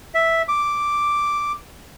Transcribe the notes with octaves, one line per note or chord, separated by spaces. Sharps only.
E5
D6